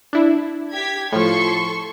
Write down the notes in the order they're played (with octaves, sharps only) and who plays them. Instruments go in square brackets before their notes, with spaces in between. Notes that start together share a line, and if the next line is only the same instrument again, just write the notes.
[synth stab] D4 E4
[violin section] G4 G#6 B6
[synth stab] A2 F3 [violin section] A4 C6 C#6